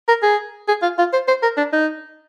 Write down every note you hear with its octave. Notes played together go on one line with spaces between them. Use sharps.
A#4
G#4
G#4
F4
F4
C5
C5
A#4
D4
D#4